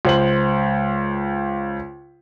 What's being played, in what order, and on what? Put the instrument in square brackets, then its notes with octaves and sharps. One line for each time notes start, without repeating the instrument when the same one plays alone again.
[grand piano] C#2 C5 F#7